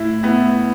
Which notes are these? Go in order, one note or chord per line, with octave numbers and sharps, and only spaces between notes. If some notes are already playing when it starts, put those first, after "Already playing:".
Already playing: A2 E4
A2 B3